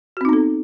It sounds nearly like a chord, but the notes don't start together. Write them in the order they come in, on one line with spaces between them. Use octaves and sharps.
F#4 C4 D#4 B3 A4